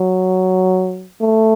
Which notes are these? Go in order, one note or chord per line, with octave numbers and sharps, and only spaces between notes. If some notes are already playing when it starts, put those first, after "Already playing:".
Already playing: F#3
A3